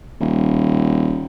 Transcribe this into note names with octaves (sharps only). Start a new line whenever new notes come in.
D#1